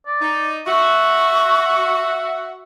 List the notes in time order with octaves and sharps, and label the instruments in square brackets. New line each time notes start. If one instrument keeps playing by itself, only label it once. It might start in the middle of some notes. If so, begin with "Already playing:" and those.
[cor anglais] D5
[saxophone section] D#4
[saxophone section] F#4 [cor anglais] E5 [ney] C#6